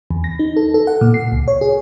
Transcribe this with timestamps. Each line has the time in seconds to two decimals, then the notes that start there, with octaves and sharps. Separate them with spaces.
0.11 E2
0.24 A#6
0.39 D#4
0.57 A4
0.74 A4
0.87 F#5
1.01 A#2
1.14 C7
1.32 C#2
1.48 C#5
1.61 G#4